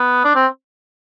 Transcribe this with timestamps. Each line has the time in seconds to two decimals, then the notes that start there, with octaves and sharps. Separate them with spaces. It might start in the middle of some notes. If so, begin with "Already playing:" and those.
Already playing: B3
0.24 D4
0.35 C4